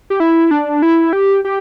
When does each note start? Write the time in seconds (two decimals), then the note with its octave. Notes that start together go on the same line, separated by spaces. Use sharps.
0.10 G4
0.20 E4
0.51 D4
0.82 E4
1.13 G4
1.45 G4